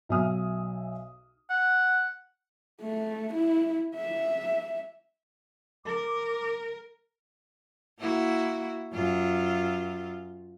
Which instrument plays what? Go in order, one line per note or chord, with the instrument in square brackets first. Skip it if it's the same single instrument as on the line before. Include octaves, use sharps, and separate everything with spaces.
[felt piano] B1 E5 G#5 D#6 F6
[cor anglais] F#5
[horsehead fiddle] A3
E4
E5
[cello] A#4 [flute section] D6
[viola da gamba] A#3 E4 F#4
F#2 F4